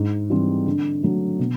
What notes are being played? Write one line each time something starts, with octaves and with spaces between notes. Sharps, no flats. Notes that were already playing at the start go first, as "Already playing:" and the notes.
Already playing: G#2
E3 G3 C4
D3
F#3 A3
B2